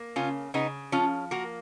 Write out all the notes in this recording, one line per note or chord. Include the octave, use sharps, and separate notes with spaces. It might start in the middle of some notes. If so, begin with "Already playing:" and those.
Already playing: A#3
C#3 C#4 F4
C#3 B3 D#4
F3 C#4 F4
A#3 F#4 A#4